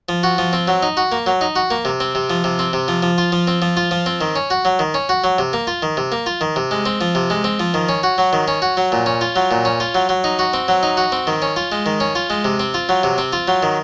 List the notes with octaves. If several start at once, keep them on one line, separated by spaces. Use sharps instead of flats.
F3
F#4
F3
C4
F#3
D#4
F#4
A#3
F#3
D#4
F#4
A#3
C3
C4
C3
F3
C3
C4
C3
F3
F3
F4
F3
C4
F3
F4
F3
C4
D#3
C#4
F#4
F#3
D#3
C#4
F#4
F#3
C3
A#3
F4
D#3
C3
A#3
F4
D#3
C3
G#3
C4
F3
C3
G#3
C4
F3
D#3
C#4
F#4
F#3
D#3
C#4
F#4
F#3
A#2
C#4
F4
F#3
A#2
C#4
F4
F#3
F#3
D#4
F#4
C4
F#3
D#4
F#4
C4
D#3
C#4
F4
G#3
D#3
C#4
F4
G#3
C3
C4
F4
F#3
C3
C4
F4
F#3
D#3